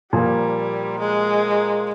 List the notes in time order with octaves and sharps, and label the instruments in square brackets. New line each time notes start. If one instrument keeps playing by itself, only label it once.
[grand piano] A#2 F3 A#3 [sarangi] G3
[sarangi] G#3